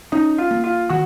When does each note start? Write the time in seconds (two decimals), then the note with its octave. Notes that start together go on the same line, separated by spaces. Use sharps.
0.12 C#4 D#4
0.38 F4
0.51 A#3
0.64 F4
0.89 D#3 F#4